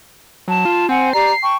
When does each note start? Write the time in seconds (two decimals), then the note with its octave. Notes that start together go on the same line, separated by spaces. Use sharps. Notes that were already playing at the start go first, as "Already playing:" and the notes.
0.48 F#3 A5
0.65 F4
0.89 C4 F#5 G#5
1.13 G4 D5 A#5 C7
1.43 G5 A5 C#6